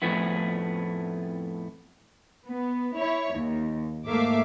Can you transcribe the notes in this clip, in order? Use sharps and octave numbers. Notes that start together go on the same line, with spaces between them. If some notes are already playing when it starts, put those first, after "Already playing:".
F2 A2 F3 A3 B3 E4
B3
E4 C#5
D#2
G#2 A3 A#3 E5 F5 D6